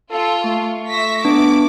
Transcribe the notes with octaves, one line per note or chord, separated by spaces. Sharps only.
F4 A4
A3 C#6
E5 A#6 B6
B3 D4 D6